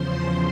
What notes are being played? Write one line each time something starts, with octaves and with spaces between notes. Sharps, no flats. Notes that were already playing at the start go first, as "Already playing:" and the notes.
Already playing: E2 C#3 F3 C5 C6